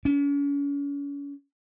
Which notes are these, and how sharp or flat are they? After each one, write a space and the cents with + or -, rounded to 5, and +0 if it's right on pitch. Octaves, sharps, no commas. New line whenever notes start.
C#4 +40